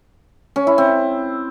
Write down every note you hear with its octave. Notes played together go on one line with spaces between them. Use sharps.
C#4
E4
C4